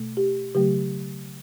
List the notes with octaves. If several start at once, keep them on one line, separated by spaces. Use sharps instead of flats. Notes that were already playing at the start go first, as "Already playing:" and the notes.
Already playing: B2 A3
G4
C#3 F#3 A3 G4